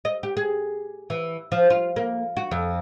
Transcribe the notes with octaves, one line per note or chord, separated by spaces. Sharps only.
D#5
G4
G#4
E3
F3
F4
A#3
F#4
F2